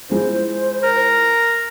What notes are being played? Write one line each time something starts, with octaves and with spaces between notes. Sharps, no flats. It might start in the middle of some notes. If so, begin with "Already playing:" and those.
F3 G#3 E4 C5
A#4